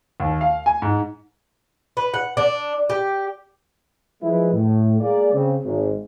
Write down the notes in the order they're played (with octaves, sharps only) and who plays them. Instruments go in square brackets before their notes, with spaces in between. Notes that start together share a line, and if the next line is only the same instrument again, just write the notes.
[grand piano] D#2
F5
G#5
G#2
[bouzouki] B4
F#5
D4
G4
[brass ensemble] F3 G#3 E4 B4
A2
G#3 A#3 G#4 D5
C#3 C4
G#1